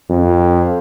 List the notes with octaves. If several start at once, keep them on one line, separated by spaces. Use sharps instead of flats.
F2